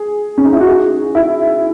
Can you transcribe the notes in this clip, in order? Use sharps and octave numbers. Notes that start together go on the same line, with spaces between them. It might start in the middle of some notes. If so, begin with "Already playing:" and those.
Already playing: G#4
C#4
D#4
E4
F#4
G#4
E4